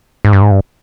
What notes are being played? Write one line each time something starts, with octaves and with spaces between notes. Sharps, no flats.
G#2
G2
G#2
G2